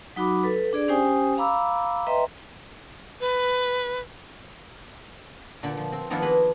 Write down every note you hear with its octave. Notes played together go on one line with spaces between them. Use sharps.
F#3 D#4 F#4 B5 D6
A4 B4
D4 G#4 D5
C#4 G4 C5 G5 G#5 D#6
F5 A#5 B5 D6 E6
B4 D#5 E5 G5 A#5 C6
B4
A#2 D3 B5
F3
C4
D#3 F3 B3 D4 E4 F4
A#3 G#4 B4